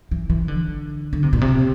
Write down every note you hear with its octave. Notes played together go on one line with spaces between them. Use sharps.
E3
E3
D3
D3
C3
A#2
C3